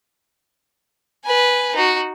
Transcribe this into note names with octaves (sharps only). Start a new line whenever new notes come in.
B4 G#5
D#4 F#4